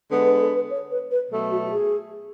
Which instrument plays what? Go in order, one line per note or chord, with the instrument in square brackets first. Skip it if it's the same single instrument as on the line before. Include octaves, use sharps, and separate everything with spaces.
[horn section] D3 G#3 B3 [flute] A4
[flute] B4
A4
B4
C#5
B4
B4
[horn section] B2 F#3 A3 [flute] A4
[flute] F#4
F#4
G#4